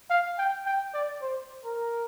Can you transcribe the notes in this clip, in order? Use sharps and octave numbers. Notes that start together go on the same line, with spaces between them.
F5
G5
G5
D5
C5
A#4